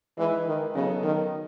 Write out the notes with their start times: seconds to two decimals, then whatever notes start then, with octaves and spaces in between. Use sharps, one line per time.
0.17 E3 G#3 D#4 G#4 B4
0.47 D#3
0.75 C#3 F#3 B3 D#4 A4
1.04 D#3